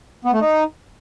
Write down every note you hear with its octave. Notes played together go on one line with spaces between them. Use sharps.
B3
A3
D#4